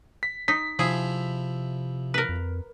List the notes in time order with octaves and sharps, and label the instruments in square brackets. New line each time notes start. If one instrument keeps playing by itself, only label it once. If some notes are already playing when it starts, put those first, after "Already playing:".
[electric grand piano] B6
[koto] D#4 [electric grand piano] B6
[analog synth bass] C3 [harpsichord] F3 E4 [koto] G#4
[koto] A#4 B4
[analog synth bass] F2